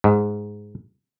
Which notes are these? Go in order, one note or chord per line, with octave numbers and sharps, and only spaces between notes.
G#2